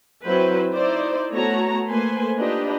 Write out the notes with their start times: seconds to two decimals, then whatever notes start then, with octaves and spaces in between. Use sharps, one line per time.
0.23 F#3 C4 E4 B4 C5
0.73 D#4 E4 C5 D5
1.31 A3 B3 F#4 C#5 A5 A#5
1.89 A3 A#3 B4 C5 G#5 C6
2.39 D4 D#4 F4 G4 B4 D#5